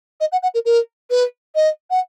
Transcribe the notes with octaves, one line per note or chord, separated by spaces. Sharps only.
D#5
F#5
F#5
A#4
A#4
B4
D#5
F#5